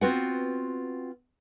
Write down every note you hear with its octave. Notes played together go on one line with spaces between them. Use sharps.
B3 C4 F4 F#4 B4 F#5